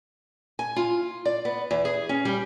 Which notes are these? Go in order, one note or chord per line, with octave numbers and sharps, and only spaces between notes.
G#5
F4
D5
B3
E2
G#4
C#4
G3